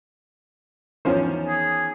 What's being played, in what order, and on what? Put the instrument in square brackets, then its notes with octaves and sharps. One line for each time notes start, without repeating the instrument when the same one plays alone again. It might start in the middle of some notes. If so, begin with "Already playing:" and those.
[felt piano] E2 D#3 [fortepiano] F3 C#4 C5
[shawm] G#4